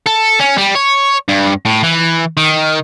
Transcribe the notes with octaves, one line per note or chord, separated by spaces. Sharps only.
A4
C#4
G3
C#5
G2
A2
E3
D#3